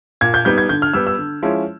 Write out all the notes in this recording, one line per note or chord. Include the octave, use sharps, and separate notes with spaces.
A#2 G#6
G6
G3 B3 D#4 G6
G#6
D3 G6
F6
G3 B3 E6
E6
D3
F3 G#3 C#4 E4